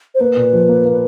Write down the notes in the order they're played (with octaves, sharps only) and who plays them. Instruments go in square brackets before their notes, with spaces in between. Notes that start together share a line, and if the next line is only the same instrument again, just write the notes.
[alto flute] C5
[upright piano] A#3 [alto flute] B4
[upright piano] A#2
F3
A#3
A#3